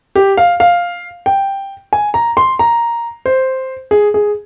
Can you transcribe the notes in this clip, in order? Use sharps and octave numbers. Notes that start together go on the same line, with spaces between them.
G4
F5
F5
G5
G#5
A#5
C6
A#5
C5
G#4
G#4